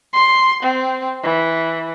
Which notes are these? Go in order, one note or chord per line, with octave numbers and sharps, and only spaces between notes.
C6
C4
E3